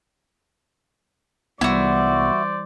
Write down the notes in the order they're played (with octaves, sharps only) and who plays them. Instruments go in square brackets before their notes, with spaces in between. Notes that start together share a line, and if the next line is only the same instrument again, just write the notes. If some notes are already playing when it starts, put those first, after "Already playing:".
[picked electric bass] C2 B3 [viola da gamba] E3 G3 [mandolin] E4 F#4 [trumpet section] C5 D5